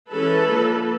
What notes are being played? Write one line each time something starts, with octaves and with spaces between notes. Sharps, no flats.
E3 G#3 C#4 A4 B4
D3 F3 A#3